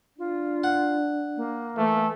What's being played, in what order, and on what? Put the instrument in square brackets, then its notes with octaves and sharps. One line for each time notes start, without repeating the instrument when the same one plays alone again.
[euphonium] D4 [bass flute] F4
[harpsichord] F#5
[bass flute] A#3
[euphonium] E3 [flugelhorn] A3